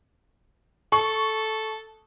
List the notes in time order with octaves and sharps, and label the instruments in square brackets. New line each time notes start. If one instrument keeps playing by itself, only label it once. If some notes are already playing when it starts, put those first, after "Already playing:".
[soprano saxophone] A4 [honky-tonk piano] C#6